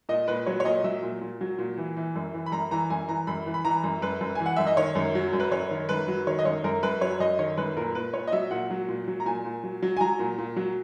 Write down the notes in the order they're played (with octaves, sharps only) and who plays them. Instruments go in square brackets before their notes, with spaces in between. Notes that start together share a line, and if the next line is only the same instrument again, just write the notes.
[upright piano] A#2 D#5
A#2 B4
F#3 C#5
C#5
A#2 D#5
F#3 E5
A#2
A#2
F#3
A#2
E3
E3
F#2
E3
B5
F#2 A#5
E3 A#5
F#2 G#5
E3 A#5
F#2 B5
E3
B5
E3 A#5
F#2
F#2 B4
F#2
E3 G#5
F#5
F#2 E5
D#5
D#3 C#5
F#2
F#3
F#2
B4
F#2 C#5
D#3
F#2 B4
F#3
D#3 C#5
D#5
F#2 C#5
F#2 A#4
F#2 B4
F#3 C#5
F#2 D#5
D#3 C#5
F#2 B4
A#2 A#4
A#2 B4
A#2 C#5
D#5
F#3 E5
A#2 F#5
F#3
A#2
F#3
A#5
A#2 G#5
A#2
F#3
F#3
G#5
F#3 A#5
A#2
A#2
F#3